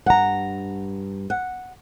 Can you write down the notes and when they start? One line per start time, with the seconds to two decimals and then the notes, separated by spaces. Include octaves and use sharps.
0.06 G2 F#5 A#5
1.30 F#5